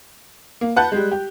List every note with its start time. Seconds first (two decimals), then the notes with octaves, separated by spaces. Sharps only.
0.61 A#3
0.76 B4 F#5 A5 F#6 G6
0.92 G3 G#3
1.12 G4